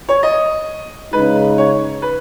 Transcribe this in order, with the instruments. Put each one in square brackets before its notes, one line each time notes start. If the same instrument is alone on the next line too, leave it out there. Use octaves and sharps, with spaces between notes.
[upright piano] C#5
D#5
[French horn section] C#3 G#3 D#4 [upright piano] B4
[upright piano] C#5
B4